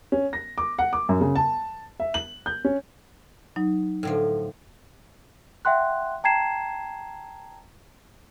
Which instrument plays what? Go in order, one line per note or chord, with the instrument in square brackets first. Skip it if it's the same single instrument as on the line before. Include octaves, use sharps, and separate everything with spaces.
[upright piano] C#4
A#6
D6
F#5
D6
F#2
C#3
A5
E5
F#7
G6
C#4
[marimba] F#3 D#4
[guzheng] A2 D3 F3
[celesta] E5 F#5 G5 C6 F#6
G5 A5 A#5 G#6 C7 E7